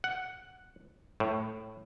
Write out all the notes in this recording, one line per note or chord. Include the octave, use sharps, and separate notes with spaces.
F#5
A2